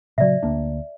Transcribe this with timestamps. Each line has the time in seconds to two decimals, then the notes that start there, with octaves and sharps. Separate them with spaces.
0.18 A#2 C#3 F#3 D5 E5
0.43 D2 A#3 D4